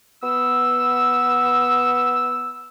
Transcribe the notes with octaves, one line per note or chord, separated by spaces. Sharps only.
B3 E6